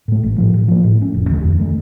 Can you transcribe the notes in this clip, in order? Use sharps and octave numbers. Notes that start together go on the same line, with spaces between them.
A2 A3
A1
A2 F3
A2
F3 A#3
A2
A3 C#4
F1
D#2 D#3 A3
F2
D#3 A3